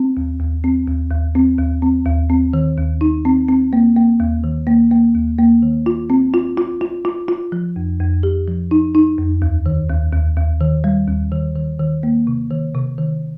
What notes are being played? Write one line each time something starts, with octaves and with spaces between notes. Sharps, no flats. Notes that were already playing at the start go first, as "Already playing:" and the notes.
Already playing: C4
D#2
D#2
C4
D#2
D#2
C4
D#2
C4
D#2
C4
D#3
D#2
D#4
C4
C4
A#3
A#3
D#2
D#3
A#3
A#3
D#2
A#3
D#3
F4
C4
F4
F4
F4
F4
F4
F3
F2
F2
G4
F3
D#4
D#4
F2
D#2
D#3
D#2
D#2
D#2
D#3
G3
D#2
D#3
D#3
D#3
A#3
C3
D#3
C3
D#3